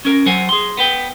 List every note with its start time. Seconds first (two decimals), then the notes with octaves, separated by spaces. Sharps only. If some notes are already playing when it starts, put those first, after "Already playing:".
0.05 C#4 A#4
0.26 F#3 C5 F#5 G#5
0.49 G#4 C6
0.77 B3 B4 G5